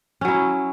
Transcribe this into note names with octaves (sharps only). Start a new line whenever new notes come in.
F#3 C#4 E4